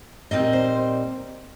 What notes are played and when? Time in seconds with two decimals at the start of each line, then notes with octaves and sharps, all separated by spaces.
0.31 A#2 G3 C4 D#4 D#5
0.53 C5